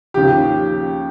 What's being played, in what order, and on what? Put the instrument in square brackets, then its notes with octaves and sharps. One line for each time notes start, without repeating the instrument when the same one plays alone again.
[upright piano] D#2 C#3 F3 G4